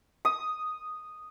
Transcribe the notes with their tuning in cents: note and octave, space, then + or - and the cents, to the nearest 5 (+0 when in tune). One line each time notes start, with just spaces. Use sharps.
D#6 +0